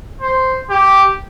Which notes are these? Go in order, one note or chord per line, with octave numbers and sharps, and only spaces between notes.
C5
G4